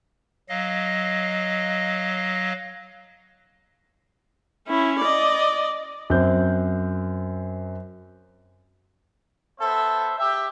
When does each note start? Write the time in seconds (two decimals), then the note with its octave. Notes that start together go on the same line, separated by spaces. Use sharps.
0.49 F#3 D#5 F5
4.68 C#4 E4
5.00 D5 D#5
6.10 F#2 C4 G6
9.60 B3 A4 C5 E5
10.19 G4 E5